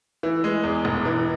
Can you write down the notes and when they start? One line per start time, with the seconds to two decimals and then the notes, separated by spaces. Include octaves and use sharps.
0.23 E3
0.44 G#3
0.64 E2
0.85 E1
1.05 E3